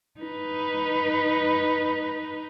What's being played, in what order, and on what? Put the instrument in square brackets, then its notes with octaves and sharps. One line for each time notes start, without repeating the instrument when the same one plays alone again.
[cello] D#4 B4